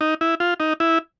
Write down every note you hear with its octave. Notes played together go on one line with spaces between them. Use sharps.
D#4
E4
F4
D#4
E4